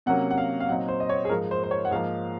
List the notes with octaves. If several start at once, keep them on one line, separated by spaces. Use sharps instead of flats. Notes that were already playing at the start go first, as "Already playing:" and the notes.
C3 F#3 A#3 C#4 F#5
F#5
F5
F5
A#2 F#3 C4 D#4 F#5
C5
D#5
C#5
G#4
G#2 F3 G#3 A#4
C5
C5
C#5
F#5
G#2 F3 A#3 F5